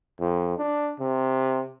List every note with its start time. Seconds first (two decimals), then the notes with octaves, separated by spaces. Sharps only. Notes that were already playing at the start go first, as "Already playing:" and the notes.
0.20 F2
0.59 D4
1.00 C3